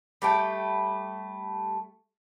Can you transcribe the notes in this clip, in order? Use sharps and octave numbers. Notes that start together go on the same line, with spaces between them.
G3 A3 G5